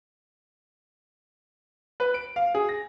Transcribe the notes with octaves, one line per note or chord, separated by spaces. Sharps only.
B4
D7
F5
G#4
A#6